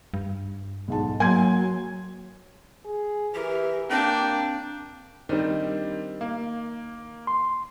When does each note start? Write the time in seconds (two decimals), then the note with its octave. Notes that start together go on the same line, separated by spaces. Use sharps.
0.14 G2
0.88 B1 G#2 A5
1.20 F#3 A#3 G#5 C6 G#6
2.85 G#4
3.34 E3 G4 A#4
3.90 A#3 C4 D4 G5
5.29 D#3 G3 C4 D4
6.21 A#3
7.27 C6